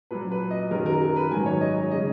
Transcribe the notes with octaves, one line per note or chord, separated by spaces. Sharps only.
A#2 F#3 B4
B4
D#5
F#2 D#3 F#3 A#4
A#4
A#4
B4
G#2 D#3 F#3 G#5
C#5
D#5
D#5
C#3 G#3 D#5